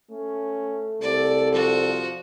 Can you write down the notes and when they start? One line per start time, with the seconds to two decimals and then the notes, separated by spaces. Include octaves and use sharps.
0.11 A3 C#4
1.01 C2 A4 D5
1.54 F3 F#4